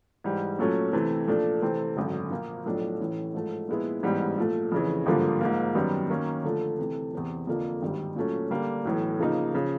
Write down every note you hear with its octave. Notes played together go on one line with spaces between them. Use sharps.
G#2 E3 G3
A#2 F#3 A3 C#4
C3 E3 A3 C4
A#2 F3 A3 D4
C3 E3 A3 C4
G#1 F#2 D3
A#2 F3 A#3
B1 A2 F3 A3 D4
A1 A2 E3
G#2 F3 A3
A#2 F3 G#3 B3 E4
A1 G#2 E3 G3 B3
A#2 F3 A3
F2 C#3 E3
G#1 G2 D3 F3 A#3
G#2 F3 A#3
F#2 D#3 G3 B3
D#3 F#3 A#3 C#4
D3 F3 A3
C3 E3 A3
E2 C3 E3
F2 D3 F3 A#3
G#1 G2 D#3 G3
A#2 F#3 A3 C#4
D3 G3 A#3 D4
B1 A2 E3
C#3 F3 A#3 D#4
C#3 F3